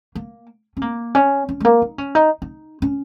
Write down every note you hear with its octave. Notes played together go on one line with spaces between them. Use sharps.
A#3
C#4
A#3
C#4
C#4
G#3
A#3
D#4
C#4
D#4
D#4
C#4